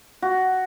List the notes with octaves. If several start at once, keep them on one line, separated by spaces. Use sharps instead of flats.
F#4